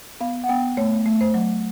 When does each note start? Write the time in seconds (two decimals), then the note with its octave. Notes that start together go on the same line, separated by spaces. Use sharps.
0.21 B3 F5
0.44 F#5
0.49 B3 G5
0.77 A3 C#5
1.06 A3
1.21 C5
1.34 F#3